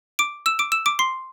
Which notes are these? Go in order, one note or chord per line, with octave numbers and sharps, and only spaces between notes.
D6 D7
E6 E7
D6 D7
E6 E7
D6 D7
C6 C7